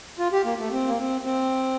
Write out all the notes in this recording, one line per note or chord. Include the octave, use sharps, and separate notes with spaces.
F4
G4
A#3
A3
C4
A#3
C4
C4